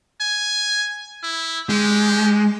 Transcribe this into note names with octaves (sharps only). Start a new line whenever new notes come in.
G#5
E4
G#3 G4